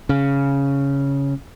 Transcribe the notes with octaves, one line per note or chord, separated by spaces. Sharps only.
C#3